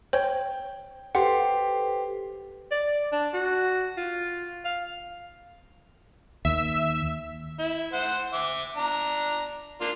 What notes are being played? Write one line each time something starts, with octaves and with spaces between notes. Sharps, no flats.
C5 C#5 G5
G4 A4 B4 C5 F#5 C6
D5
D4
F#4
F4
F5
D#2 E5
E4
C5 F#5
E5 D6
D4 A#5
A#3 D4 F4